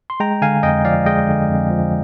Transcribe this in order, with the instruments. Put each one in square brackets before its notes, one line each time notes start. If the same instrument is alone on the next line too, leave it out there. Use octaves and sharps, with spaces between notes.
[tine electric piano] C6
G#3 G5 A#5
D3 F5 G#5
F2 D#5 G5
F3 D5 F5
G#3 D#5 G5
D3
F2
F3